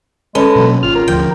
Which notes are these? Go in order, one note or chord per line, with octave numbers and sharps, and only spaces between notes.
G#3 C#4 A4 B4
B2 F#3 A#3
G#1 F4 F6
A#4
D#1 D2 F3 G5